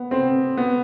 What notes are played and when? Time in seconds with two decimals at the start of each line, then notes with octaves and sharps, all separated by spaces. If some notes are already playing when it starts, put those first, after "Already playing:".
Already playing: B3
0.11 C4
0.57 B3